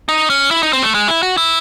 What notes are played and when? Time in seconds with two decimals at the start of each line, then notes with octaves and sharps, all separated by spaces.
0.09 D#4
0.30 C#4
0.51 E4
0.63 D#4
0.73 C4
0.83 A3
0.94 G#3
1.08 E4
1.23 F#4
1.37 E4